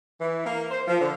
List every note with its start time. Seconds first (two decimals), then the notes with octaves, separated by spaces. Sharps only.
0.21 E3
0.46 A#3
0.71 C5
0.88 F3
1.01 D3